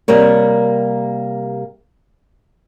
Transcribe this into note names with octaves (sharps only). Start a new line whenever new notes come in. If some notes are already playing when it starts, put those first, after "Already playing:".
C3 G3 A#3 A#4 C#5